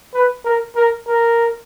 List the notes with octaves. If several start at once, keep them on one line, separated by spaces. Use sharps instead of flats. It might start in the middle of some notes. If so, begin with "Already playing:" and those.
B4
A#4
A#4
A#4